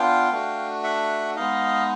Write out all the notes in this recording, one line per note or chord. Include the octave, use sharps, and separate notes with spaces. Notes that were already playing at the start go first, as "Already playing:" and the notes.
Already playing: B3 D4 F4 F5 G5
A3 D4 F#4
E5 F#5
G#3 B3 D#4 D#5 F5